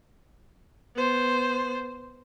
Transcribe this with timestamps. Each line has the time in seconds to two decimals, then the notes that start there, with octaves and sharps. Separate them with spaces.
0.96 B3 C5